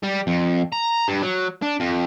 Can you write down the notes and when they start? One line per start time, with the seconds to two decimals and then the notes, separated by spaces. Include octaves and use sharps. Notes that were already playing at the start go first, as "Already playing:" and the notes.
0.03 G3
0.27 F2
0.72 A#5
1.08 G2
1.22 F#3
1.62 D4
1.80 F2